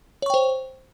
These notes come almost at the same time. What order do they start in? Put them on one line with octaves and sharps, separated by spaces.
C#5 C#6 G5 C5